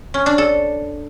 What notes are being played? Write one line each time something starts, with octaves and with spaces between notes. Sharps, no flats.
C#4
D4
A4